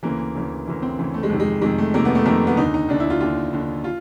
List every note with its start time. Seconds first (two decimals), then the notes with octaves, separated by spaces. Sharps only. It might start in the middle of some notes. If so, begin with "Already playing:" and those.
0.03 D2 C#3 E3 A#3
0.35 D2 C#3 E3
0.67 D2 C#3 E3
0.82 C4
0.99 D2 C#3 E3
1.14 A3
1.23 G#3
1.30 F2 C3 D#3
1.40 G#3
1.62 F2 C3 D#3 G#3
1.78 A3
1.94 F2 C3 D#3 A#3
2.05 B3
2.15 A3
2.26 F2 C3 D#3 A#3
2.47 B3
2.57 D#2 D3 D#4
2.74 D#4
2.89 D#2 D3 D4
3.00 E4
3.10 F4
3.21 D#2 D3 F4
3.53 D#2 D3
3.84 F4